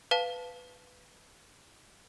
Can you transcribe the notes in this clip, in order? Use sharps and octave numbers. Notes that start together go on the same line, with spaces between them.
B4 F5 A5